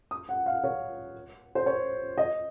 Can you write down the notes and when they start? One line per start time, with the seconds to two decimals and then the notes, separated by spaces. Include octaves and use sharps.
0.11 D#6
0.29 F#5
0.46 F5
0.64 C#5
1.55 C5
1.66 C#5
2.18 D#5